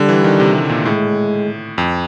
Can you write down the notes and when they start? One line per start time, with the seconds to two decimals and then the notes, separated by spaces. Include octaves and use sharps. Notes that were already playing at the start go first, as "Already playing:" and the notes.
Already playing: D3 G3
0.09 E3
0.24 D#3
0.40 C3
0.54 C3
0.70 A#2
0.85 A2 G#3
1.78 F2